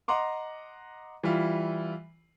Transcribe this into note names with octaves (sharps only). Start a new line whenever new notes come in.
D#5 F#5 A#5 C6 D6
E3 G3 E4 F4